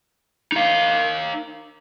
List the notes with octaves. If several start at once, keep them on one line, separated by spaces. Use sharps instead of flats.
D#4 F5